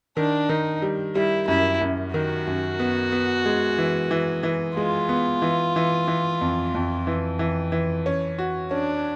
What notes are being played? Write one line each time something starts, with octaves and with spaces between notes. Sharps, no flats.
D#3 D4
D#3 D#4
G3
G3 E4
F#2 E4
F#2
D#3 F#4
F#2
B3
B3
G#3
E3
E3
E3
G#3 F4
B3
E3
E3
E3
F2
F2
E3
E3
E3
C#4
F#4
C#4 D4